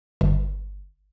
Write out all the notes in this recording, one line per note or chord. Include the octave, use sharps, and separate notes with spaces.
G1